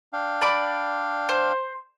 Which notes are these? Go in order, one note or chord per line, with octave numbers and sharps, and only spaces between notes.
D4 F5 G5
D5 B5 D6
C5